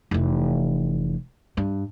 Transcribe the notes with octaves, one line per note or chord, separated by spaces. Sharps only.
F1 E3
G2